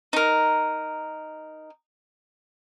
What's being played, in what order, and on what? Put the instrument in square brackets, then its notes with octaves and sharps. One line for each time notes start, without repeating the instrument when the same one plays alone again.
[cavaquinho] D#4 A#4